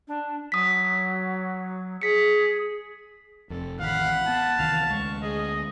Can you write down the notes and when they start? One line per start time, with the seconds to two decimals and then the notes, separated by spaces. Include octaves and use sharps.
0.07 D4
0.52 F#3 D#6 B6
2.02 G#4 B6 C#7
3.50 F1 F2 A4
3.80 A1 D#3 F5 F#5 B5
4.28 B3 A5
4.58 C2 D#3 E3 F5
4.90 D2 G#3 C#6
5.23 G#4 D#5